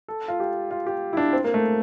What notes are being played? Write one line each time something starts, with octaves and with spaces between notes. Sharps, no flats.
A4
F4
G4
F4
G4
E4
D4
C4
A#3
A3